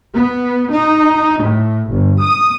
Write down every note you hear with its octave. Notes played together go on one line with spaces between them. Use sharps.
B3
D#4
A2
G1
D#6